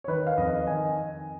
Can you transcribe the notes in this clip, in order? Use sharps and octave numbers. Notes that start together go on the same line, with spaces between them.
C#5
D#3 B4
F5
F2 D#5
D#3 G#5